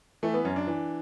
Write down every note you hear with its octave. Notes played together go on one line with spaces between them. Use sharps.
E3 A3
B3
F#2 C#4
D4
E3